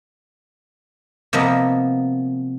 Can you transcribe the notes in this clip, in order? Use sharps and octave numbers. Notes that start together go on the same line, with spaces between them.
C3 F3 A#3 B3 D#5